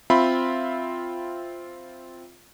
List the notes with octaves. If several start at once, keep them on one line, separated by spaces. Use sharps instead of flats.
C4 F4 E5 B5